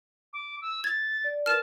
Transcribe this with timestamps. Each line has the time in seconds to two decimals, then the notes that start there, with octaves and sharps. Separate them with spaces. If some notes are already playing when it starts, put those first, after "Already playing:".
0.33 D6
0.62 E6
0.84 G#6 A6
1.24 D5
1.46 A#4 B4 A5 F6 E7